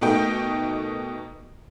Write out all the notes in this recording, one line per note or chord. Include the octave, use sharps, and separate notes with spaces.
B2 A3 A#3 D#4 G5